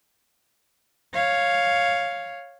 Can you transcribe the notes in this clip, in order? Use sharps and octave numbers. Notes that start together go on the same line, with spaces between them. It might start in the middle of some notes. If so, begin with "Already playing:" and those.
C#5 F5